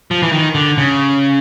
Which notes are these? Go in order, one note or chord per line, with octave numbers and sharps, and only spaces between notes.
F3
E3
D#3
D3
C#3